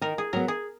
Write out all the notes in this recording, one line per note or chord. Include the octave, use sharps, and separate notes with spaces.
D#3 A#4
G#4
F#3 B3 A#4
G#4